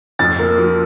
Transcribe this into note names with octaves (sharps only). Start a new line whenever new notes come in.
F2 A6
A#3
F3